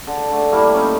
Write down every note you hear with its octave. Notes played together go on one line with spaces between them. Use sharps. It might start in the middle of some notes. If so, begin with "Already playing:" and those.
D3
D3 A3
G3 A3 A#3 E4
C#4 D#4